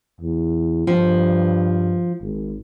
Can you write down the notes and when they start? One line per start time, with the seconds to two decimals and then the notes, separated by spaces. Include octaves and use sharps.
0.21 E2
0.87 G2 F3
2.20 G#1